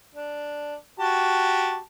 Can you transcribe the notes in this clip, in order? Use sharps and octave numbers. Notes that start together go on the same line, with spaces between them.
D4
F#4 G4 A5